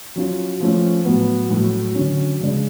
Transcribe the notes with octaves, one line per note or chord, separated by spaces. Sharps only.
F#3 C#4 F4
F3 A3 C#4
A2 F#3 B3
A2 F#3 A3
D3 F#3 C#4
C#3 G#3 D4 G#4